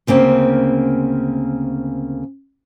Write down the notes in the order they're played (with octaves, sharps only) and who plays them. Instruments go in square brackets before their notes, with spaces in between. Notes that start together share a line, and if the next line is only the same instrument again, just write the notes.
[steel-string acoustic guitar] D2 C#3 A#3 C4 C#4